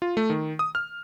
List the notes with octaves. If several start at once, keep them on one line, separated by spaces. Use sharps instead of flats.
F4
A3
D#3
D#6
F6